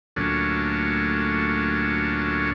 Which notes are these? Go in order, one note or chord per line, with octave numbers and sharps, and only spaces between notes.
D2 A#2 F#3 A3 C#4 D4